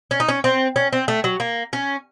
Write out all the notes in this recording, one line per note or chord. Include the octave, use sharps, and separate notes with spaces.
C#4
D#4
C#4
C4
C#4
C4
A3
F#3
A#3
C#4